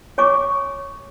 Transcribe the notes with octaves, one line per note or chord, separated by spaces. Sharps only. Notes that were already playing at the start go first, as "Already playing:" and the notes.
C#5 G#5 C#6 D6